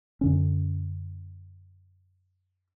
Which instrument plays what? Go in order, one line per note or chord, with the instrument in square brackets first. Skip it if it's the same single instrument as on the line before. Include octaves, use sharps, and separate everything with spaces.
[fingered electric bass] F#2 D3 C#4